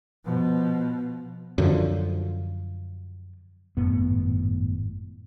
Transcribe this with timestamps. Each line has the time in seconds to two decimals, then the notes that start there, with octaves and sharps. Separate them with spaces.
0.25 B2 F3
1.58 F#2 D3 F3
3.77 G#1 F#2 A2 B3